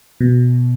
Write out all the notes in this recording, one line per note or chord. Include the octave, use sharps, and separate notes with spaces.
B2